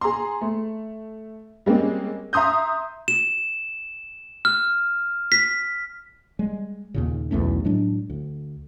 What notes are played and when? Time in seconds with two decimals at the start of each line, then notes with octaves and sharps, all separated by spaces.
0.01 G#4 A#5 C6
0.41 A3
1.66 G3 G#3 A#3 C4 C#4
2.33 E5 A#5 C6 D#6 G6
3.08 E7
4.45 F6
5.32 B6
6.39 G3 G#3
6.94 D#2 A#2 C#3
7.31 B1 E2 A3 C#4
7.65 A2 F#3 G#3 D4
8.10 D2